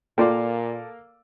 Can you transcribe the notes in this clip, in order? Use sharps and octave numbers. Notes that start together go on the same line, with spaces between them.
A#2 A#3 F4 A4 D5 F5 G5